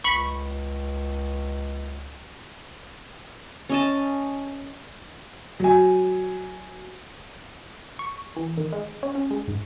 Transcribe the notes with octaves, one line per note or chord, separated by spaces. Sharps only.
C#2 B5 C#6
C#4 D#5 A5
F#3 G#5
C#6
E3
D#3
G#3
C#4
C#4
G#3
G#2